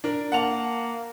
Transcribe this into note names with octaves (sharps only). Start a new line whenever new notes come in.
D4 A#4
A#3 F#5 A5 F7